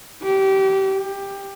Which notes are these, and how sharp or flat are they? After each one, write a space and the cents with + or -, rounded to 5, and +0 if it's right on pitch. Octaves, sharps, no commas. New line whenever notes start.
G4 -25
G4 +15